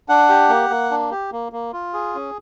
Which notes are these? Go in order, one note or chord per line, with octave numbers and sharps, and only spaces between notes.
D4 F#5
G4
A#3
A#3
D4
G4
A#3
A#3
F4
G#4
C#4